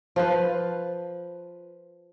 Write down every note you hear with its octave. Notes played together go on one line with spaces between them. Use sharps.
F3 F4 B4